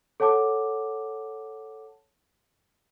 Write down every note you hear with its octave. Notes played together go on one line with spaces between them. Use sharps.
A4 C#5 F#5 A5 D6